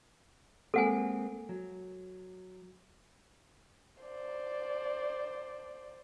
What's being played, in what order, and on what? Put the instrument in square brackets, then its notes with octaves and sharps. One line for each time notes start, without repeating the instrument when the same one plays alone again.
[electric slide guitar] G#3 A#3 C4 [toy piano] A4 F#5 G#5
[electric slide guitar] F#3
[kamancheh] C5 D5